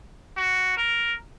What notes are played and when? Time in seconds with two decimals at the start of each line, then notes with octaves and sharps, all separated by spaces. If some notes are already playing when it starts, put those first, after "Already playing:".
0.37 F#4
0.77 A#4